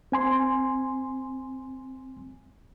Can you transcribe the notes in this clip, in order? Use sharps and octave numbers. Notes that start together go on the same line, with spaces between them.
C4 G#5 C6